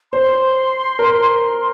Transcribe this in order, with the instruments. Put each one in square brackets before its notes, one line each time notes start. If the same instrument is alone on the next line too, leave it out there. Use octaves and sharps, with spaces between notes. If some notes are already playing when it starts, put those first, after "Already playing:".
[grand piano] C5 [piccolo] C6
[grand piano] A#4